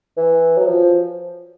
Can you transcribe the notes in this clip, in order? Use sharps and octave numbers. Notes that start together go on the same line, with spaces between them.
E3
F#3
F3